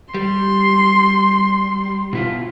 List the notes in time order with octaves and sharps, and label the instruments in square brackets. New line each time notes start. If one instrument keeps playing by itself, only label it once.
[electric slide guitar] G3 [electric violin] C6
[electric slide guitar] B2 E4 F4